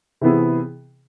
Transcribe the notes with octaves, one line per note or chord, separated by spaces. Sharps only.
C3 E3 B3 E4 G#4